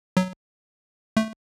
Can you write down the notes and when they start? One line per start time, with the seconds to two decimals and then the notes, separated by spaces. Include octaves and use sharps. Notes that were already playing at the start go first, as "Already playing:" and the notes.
0.17 F#3
1.17 A3